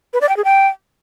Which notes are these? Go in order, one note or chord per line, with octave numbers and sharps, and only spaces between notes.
B4
D5
G5
G#4
G5